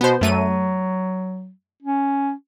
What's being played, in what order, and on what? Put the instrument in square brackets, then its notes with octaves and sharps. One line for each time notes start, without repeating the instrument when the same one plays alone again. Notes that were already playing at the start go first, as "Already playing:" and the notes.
[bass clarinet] B2 [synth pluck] B3 C5
[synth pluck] F#2 A3 D#7 [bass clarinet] F#3
[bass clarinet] C#4